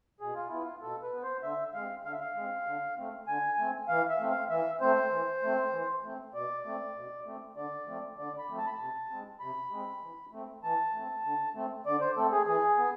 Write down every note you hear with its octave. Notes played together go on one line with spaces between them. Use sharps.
B2 G#4
F4
B3 E4
F4
B2 A4
B4
B3
C5
D3 E5
G#3 C4 F5
D3 F5
E5
F5
G#3 C4
D3
A3 C4
D3 G#5
A3 C4
E3 F5
E5
A3 C4
F5
E3 E5
A3 C4 C5
E3
A3 C4
E3
A3 C4
B2 D5
A3 C4
B2
A3 C4
D3 D5
F3 A3 C4
D3 D5
B5
F3 A3 C4
A5
B5
C3 A5
G#3 C4
C3 B5
G#3 C4
E3
A3 C4
E3 A5
A3 C4
D3
A3 C4
D3 D5
C5
A3 C4 A4
G#4
E3 G#4
B3